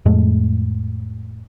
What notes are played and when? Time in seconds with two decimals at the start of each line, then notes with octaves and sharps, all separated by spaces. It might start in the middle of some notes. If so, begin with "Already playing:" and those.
0.05 F2 A2 G#3 A3